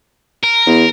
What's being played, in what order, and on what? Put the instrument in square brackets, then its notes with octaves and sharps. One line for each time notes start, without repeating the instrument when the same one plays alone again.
[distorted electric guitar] A#4
[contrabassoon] E2